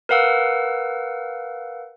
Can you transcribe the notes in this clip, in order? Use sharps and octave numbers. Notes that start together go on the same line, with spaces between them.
A#4 B4 F5 F#5 E6